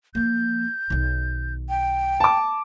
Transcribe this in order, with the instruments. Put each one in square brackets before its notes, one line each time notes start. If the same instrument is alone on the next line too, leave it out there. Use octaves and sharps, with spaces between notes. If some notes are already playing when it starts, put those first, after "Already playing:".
[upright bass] F3 A#3 [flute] G6
[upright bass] B1 D#3
[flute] G5
[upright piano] A5 D6